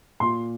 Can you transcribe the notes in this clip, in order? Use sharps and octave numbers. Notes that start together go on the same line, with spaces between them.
A#2 C6